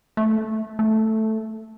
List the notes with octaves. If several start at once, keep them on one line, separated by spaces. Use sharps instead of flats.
A3
A3